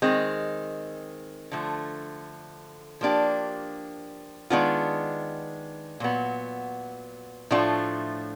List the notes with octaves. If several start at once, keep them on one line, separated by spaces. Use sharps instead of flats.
D#3 G#3 C4
D3 F3 A3
F3 A#3 D4 G4
D#3 G#3 B3 D4 F4
A#2 F#3 B3
A2 F3 A3 D4 F4